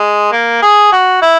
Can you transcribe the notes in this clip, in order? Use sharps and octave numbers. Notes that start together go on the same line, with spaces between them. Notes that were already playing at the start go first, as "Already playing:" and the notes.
Already playing: G#3
A#3
G#4
F#4
E4